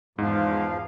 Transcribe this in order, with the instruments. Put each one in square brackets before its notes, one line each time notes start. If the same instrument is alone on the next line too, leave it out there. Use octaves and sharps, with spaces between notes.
[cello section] E2 F5 [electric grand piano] G#2 [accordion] F3